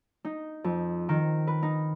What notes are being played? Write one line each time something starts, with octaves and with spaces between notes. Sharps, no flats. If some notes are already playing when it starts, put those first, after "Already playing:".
D#4
F2
D#3
B4
D#4